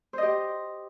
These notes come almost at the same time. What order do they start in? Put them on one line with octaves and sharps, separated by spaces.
C5 D#5 G4